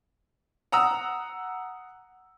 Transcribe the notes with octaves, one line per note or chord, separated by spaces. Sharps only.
F#5 A#5 D#6 E6